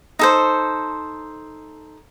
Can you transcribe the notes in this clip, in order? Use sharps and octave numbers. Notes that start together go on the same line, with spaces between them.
D#4 A4 C5